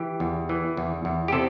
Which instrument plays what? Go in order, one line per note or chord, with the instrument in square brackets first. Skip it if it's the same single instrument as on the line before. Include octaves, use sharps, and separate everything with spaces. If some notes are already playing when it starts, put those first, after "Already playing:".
Already playing: [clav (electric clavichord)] E3 G4
E2
E3
E2
E2
G4
C3 A4